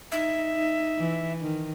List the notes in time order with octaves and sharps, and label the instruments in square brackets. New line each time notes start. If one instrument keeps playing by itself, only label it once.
[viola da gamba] D#4 [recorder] E5
[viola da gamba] D#4
E3
D#3